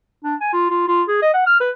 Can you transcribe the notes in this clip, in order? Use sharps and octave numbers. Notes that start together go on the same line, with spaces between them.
D4
G#5
F4
F4
F4
G#4
D#5
F#5
F6
B4